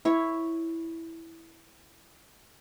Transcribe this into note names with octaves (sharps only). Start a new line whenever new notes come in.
E4 C#5